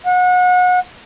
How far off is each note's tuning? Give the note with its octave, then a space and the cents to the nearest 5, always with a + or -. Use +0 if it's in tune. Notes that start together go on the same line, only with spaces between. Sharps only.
F#5 -30